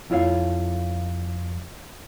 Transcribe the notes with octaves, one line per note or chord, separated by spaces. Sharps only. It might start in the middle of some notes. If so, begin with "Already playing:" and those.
F2 E4 F4 C#5 F5